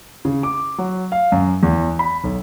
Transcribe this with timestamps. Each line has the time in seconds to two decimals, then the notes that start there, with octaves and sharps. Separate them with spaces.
0.25 C#3
0.43 D6
0.78 F#3
1.12 F5
1.32 F#2
1.63 E2
1.99 B5
2.24 B1